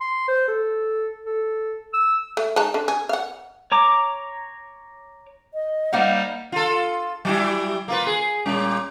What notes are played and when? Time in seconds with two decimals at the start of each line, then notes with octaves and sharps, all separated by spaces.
0.01 C6
0.28 C5
0.48 A4
1.26 A4
1.94 E6
2.37 A3
2.56 G#3 D#4 A5
2.74 D3
2.88 G#4
3.09 F5 F#5
3.72 C#5 A#5 D6
5.54 D#5
5.93 G3 A#3 D#4 C5 F5 F#5
6.52 F4 A4
7.25 F#3 G3 E4
7.88 A#3 F4 B4
8.06 G#4
8.45 A#2 G3 C#4